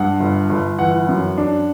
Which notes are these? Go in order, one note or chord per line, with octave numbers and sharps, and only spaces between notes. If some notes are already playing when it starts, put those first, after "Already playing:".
Already playing: G2 F#5
G1
G1
E3 F#5
F#2
D4